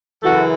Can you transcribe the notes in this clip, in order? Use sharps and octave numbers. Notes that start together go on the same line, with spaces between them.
F#2 C#3 E3 F#4 A4